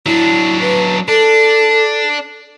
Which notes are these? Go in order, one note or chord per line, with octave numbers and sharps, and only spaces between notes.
F#3 D4 E4
B4
D4 A4